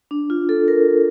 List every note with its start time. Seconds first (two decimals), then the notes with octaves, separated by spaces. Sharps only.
0.11 D4
0.30 F4
0.49 A4
0.68 A#4